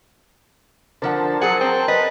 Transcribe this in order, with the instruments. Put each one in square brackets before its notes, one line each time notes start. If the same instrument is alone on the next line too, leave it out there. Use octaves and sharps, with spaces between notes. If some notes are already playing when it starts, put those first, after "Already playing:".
[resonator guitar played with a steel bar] D3 F3 F#5 [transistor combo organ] A#4 C5 A5
[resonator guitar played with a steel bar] F#3 G#4 G#5 [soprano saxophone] F#5
[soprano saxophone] C4
[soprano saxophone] B4 [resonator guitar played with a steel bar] D#5